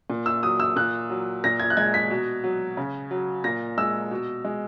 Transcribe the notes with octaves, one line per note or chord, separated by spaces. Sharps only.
A#2
E6
F#3 D#6
E6
A#2 F#6
F#3
A#2 A#6
G#6
F#6
G#3 G#6
B6
B2
F#3
C#3
F#3
A#2 A#6
G#3 E6
B2
G#3